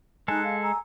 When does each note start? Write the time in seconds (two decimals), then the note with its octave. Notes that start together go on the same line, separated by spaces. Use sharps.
0.28 G#3 D#4 A4 G#5 F#6
0.44 F5
0.62 G#5 A#5 E6